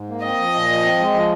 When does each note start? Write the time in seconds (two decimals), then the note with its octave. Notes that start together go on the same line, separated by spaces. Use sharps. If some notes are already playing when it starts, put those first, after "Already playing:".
Already playing: G#2
0.09 A#3
0.23 C4 D#5
0.39 F3
0.54 A#2
0.70 F3
0.84 C4
0.99 G#3
1.14 F3